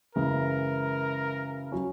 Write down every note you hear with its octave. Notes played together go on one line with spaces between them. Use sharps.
F#2 C#3 E3 G#3 A#4
F#3 C#4